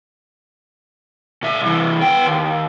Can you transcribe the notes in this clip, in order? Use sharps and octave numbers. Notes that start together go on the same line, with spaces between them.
A#2 E5
C2 E3
B3 G5
D#2